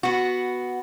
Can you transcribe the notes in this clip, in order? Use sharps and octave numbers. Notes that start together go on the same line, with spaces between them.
B3 F#4